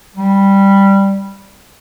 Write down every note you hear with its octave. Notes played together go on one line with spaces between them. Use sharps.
G3